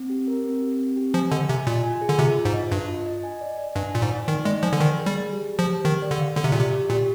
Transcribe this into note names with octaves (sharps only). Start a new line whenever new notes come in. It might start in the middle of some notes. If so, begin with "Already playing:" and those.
Already playing: C4
G4
A#4
C4
G4
C4
G4
F3 G#5
D3 D#5
C3 G#5
A#2 F4
G#5
G#4
D3
C3 F4
F4
G#2
D#5
G2 D#5
F4
D#5
G#5
D5
D5
G2 G#5
A#2 G#5
G#2
D5
D#3 D#4
G#3 D5
F3 G#5
D3
D#3 D5
G#4
G3
G#4
G4
G4
F3
G4
D#3 G4
D5
D3
F5
D3 D5
C3
A#2
C3 G4
G4
A#2 G4